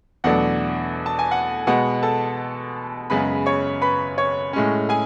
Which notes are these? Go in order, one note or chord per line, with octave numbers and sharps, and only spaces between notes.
E2 B2 F#3 A3 D4 F#5
A5
G#5
F#5
B2 G#3 B3 F#5
A4 A5
F#2 C#3 G#3 B3 B4 B5
C#5 C#6
B4 B5
C#5 C#6
A2 G#3 C#4
G#4 G#5